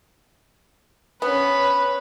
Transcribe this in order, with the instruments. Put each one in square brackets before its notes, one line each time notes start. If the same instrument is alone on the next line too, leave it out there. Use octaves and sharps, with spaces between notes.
[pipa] B3 [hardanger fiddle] C#4 B4